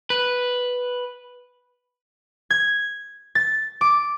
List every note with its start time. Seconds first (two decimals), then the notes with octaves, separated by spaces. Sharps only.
0.10 B4
2.50 G#6
3.35 A6
3.81 D6